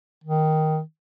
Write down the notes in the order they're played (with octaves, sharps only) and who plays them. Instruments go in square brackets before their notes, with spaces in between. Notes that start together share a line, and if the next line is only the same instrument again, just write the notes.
[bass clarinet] D#3